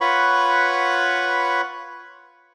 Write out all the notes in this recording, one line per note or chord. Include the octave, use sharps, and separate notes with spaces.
F4 B4 C#5 F#5 B5 C#6